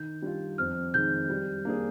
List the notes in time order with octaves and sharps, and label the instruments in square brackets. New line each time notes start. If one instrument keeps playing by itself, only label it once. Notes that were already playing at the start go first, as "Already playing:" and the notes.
Already playing: [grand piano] D#3 [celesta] G6
[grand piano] G3 D4 F4
[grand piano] F2 [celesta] F6
[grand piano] D#3 G#3 [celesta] G6
[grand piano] G3
A#3 D4 G#4